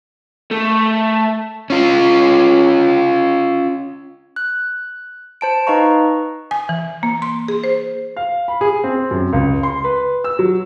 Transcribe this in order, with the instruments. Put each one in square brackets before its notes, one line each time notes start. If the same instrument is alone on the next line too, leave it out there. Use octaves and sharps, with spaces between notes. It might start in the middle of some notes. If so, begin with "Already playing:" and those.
[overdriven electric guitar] A3
[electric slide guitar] C#4 F4
[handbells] F#6
C5 A5 D7
D#4 B4 D#5 F5 A#5 C#6
[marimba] G#5
E3
A#3
C6
G#4
C5
[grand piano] F5
B5
G#4
C4
F#2
C#2
C6
B4
E6
F#3